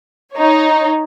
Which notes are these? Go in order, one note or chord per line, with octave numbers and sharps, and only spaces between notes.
D#4 C#5